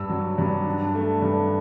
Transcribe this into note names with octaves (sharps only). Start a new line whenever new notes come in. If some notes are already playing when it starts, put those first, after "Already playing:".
Already playing: G2 E6
F#3
G2
D4
A3
G2